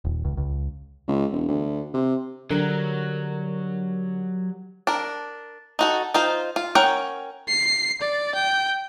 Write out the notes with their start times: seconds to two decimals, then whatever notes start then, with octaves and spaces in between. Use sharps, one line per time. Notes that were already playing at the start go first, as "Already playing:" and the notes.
0.05 D#1
0.25 C#2
0.37 C#2
1.08 C#2
1.32 E1
1.49 D2
1.94 C3
2.51 D3 F#3 G3 A#4
4.87 D4 A#4
5.79 D#4 F#4 A4
6.14 D#4 F4 C5
6.56 F4
6.75 C#4 A#4 F#5 G5
7.48 C7
8.01 D5
8.35 G5